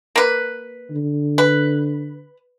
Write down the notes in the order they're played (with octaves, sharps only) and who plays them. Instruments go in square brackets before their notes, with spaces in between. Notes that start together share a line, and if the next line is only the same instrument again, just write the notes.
[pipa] A#3 B4
[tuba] D3
[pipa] B4